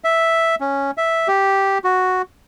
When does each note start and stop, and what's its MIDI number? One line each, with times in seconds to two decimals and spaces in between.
0.04 0.55 76
0.61 0.91 61
0.98 1.28 76
1.28 1.78 67
1.84 2.22 66